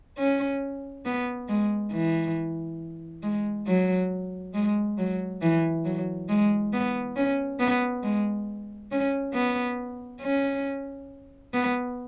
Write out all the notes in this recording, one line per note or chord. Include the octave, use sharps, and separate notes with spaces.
C#4
B3
G#3
E3
G#3
F#3
G#3
F#3
E3
F#3
G#3
B3
C#4
B3
G#3
C#4
B3
C#4
B3